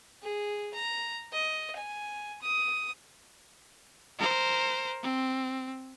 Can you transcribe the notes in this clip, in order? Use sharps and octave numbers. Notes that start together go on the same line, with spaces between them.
G#4
A#5
D#5
G#5
D#6
A#4 C5
C4